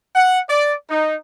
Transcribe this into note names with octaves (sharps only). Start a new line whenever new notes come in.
F#5
D5
D#4